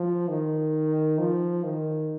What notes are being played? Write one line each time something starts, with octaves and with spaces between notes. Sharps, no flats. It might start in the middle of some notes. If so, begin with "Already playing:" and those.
Already playing: F3
D#3
F3
D#3